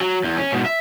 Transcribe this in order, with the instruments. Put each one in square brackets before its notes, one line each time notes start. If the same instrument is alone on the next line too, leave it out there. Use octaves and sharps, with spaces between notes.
[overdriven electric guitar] F#3
E2
C#4
G#2 B2
E5